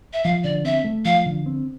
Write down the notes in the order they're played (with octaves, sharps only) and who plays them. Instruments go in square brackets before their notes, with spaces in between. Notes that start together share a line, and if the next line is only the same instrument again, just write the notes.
[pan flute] E5
[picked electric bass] F3 [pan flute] F5
[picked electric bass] D3 [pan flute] D5
[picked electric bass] C4 [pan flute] E5
[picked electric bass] A3
[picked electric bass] F3 [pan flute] F5
[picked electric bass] D3
C4